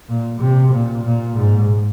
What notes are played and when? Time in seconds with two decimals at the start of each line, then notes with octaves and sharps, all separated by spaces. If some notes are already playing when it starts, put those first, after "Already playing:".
0.09 A#2
0.41 C3
0.73 A#2
1.05 A#2
1.37 G#2